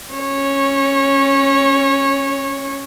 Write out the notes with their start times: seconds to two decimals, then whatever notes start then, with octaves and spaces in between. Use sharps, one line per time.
0.13 C#4 C#5